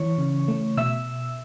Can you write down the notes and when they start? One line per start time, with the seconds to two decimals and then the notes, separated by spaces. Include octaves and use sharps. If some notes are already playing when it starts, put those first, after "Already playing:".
Already playing: E3 C#5 C#6
0.18 C#3
0.48 A3
0.77 B2 E5 E6